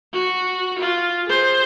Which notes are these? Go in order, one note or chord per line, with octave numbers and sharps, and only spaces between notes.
F#4
F4
G#4 C5